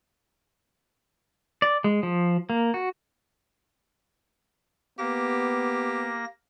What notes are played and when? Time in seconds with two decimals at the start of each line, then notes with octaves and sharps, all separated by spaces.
1.62 D5
1.84 G#3
2.03 F3
2.50 A#3
2.74 F#4
4.99 A#3 B3 G4 A#6